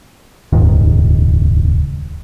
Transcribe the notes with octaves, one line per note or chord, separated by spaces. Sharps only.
D#1 C#2 G#2 D#3